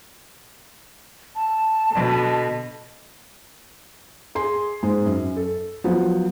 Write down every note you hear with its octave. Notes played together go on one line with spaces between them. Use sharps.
A5
B2 D3
G#4 C6
G#2 G#3
F#2
A4
F3 F#3 B3